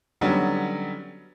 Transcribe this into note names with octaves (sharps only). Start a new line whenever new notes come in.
D3 F#3 G3 B3 C#4 D#4